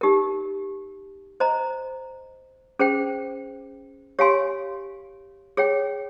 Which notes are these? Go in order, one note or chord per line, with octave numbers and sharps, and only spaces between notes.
D#4 G4 A#4
C5 D#5 A#5
C#4 G#4 C5 G5
G4 C#5 F5 G#5 C6
G#4 C#5 G5